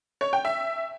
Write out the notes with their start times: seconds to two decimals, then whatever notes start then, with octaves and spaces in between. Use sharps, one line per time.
0.21 C#5
0.33 G5
0.45 E5